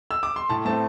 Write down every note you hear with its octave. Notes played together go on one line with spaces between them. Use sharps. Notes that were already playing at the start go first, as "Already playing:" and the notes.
E6
D6
C6
A2 A5
A3 C4 A5